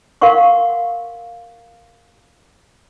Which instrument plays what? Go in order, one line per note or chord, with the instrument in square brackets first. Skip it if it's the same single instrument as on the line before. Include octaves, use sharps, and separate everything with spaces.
[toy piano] A#4 F5 F#5 C6 C#6